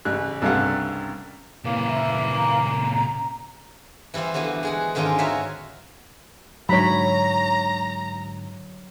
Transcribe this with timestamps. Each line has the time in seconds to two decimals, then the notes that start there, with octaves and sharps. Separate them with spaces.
0.05 A1 C#3 F#6
0.42 C2 G2 C#3 A3 F5 F#5
1.64 A#2 C#3 E3 A#3
1.89 E5
2.37 A#5
4.14 E3 G3 E4 C5 F5
4.34 D3 E3 G3 B3 F#4
4.63 G#3 G#4 F#5
4.95 G#2 D3 D#3 G#3 C#4 F4
5.18 F#4 A#4 C#5 E5 F5 G#5
6.69 G#2 D3 F#3 C#5 A#5 B5